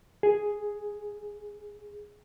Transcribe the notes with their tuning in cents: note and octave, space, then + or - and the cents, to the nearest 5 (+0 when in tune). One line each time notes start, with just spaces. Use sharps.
G#4 +5